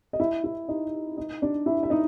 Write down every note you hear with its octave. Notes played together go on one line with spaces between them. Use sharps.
D#5
E4 E5
E4 E5
D#4 D#5
D#4 D#5
D4 D5
E4 E5
E5
D#4 D#5